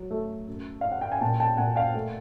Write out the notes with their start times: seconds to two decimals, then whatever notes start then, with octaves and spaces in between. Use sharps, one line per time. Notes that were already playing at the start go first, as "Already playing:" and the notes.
Already playing: F#3
0.11 A3
0.47 F#2
0.81 C#3 F5
0.92 F#5
1.01 G5
1.12 G#5
1.21 A#2 G5 A5
1.40 G5 A5
1.57 A#2 F#5 G#5
1.76 F5 G5
1.94 A3